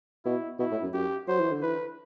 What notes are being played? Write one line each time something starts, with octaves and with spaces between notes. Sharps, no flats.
B2 E4
B2 E4
A2
F#2
F#2 G4
F#3 C5
E3
D3
E3 B4